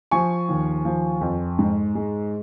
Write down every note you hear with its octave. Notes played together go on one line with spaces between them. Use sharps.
F3 G#5 C#6
D#2
F3
F2
G#2
G#3